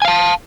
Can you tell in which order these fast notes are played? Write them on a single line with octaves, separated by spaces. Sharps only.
G#5 F5 A5